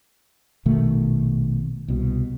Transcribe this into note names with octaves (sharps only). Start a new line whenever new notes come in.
A#1 B2 D#3 A3
C2 B2